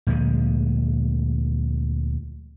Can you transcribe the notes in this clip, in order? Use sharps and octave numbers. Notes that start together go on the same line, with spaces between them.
D2 A#2 F3 G#3